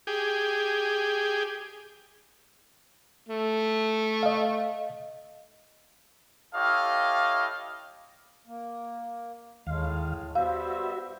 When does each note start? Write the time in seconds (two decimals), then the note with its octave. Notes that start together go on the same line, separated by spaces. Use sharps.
0.07 G4 G#4
3.29 A3
4.23 D#5 F5
6.54 E4 G4 A4 C#5 D#5 F5
8.47 A#3
9.67 D#2 A2 G#3 F5
10.35 G3 B3 F#4 C5 E5 F5